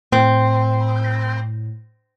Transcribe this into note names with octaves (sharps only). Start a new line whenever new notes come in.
A2 C4